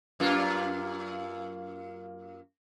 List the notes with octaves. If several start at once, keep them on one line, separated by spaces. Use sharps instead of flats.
F#2 A#3 F4